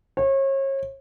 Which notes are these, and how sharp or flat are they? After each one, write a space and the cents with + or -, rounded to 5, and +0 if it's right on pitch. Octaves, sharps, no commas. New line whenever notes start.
C#5 -35